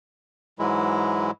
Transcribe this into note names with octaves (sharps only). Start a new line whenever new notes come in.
G#2 E3 F#3 G#3 E4